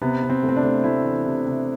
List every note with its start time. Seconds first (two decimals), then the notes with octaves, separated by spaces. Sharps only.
0.02 C3 B3
0.22 C3
0.30 C4
0.43 A3
0.49 C4
0.56 D4
0.63 A3
0.84 A3 E4
1.05 E3
1.26 C3
1.46 C3